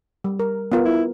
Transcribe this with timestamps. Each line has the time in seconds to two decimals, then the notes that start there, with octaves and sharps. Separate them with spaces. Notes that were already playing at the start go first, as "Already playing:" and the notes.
0.24 G3
0.40 A#4
0.72 B3 F4 A#4
0.85 E4